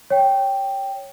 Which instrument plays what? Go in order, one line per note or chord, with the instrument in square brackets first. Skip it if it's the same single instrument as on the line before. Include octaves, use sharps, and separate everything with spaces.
[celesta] C#5 G5